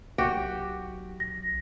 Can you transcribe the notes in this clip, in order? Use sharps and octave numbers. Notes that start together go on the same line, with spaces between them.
B1 F#4 G4
A#6